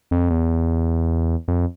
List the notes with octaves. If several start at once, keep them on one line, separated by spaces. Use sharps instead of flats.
F2
E2
F2